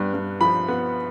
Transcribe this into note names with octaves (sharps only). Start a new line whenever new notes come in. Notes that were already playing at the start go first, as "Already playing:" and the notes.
Already playing: G2 B3
G2
F3 B5
B3